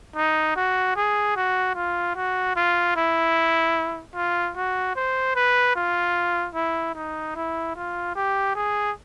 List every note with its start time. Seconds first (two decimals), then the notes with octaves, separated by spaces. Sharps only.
0.16 D#4
0.56 F#4
0.96 G#4
1.36 F#4
1.76 F4
2.16 F#4
2.56 F4
2.96 E4
4.15 F4
4.56 F#4
4.96 C5
5.36 B4
5.75 F4
6.55 E4
6.95 D#4
7.36 E4
7.76 F4
8.15 G4
8.55 G#4